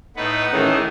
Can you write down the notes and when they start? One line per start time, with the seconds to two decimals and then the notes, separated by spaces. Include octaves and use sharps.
0.16 A2 B3 D#4 B4 F#5
0.53 A2 D#3 E3 A3 C#4 G#4 A#4